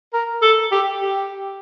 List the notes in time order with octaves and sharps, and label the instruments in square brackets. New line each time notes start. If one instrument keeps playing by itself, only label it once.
[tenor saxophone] A#4
A4
G4
G4